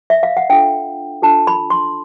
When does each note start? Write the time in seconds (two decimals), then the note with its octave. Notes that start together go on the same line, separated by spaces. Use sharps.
0.10 E5
0.23 F5
0.37 F#5
0.50 D4 F4 A4 G5
1.22 D4 F4 A4 A5
1.47 B5
1.70 C6